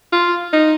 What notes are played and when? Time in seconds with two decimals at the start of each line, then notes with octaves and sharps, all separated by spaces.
0.13 F4
0.53 D#4